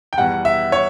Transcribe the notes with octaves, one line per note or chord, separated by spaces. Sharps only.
G5
E2 B2 G3 F#5
E5
C#5